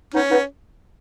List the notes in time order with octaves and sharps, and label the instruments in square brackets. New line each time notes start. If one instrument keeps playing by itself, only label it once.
[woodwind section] B3 D#4 [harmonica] C#4
[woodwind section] B3 D#4